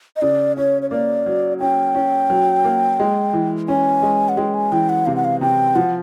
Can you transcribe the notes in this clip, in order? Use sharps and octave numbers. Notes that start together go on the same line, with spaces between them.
D#5
C#3 D5
C#4 C#5
C#5
A#3 D5
F#3
C#4 G5
C#4
F#3
A#3
G#3
E3
C#4 G#5
G#3
F#5
G#3 G5
G#5
E3 G5
F#5
C3 F5
F#5
F5
C3 G5
F3 F#5